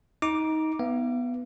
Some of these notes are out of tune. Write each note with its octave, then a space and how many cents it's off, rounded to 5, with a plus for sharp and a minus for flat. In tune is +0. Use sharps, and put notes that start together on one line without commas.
D#4 +20 D6 +0
B3 +0 F5 -45